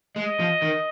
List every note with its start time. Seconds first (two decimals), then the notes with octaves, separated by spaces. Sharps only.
0.16 G#3 D#5
0.40 F3
0.62 D#3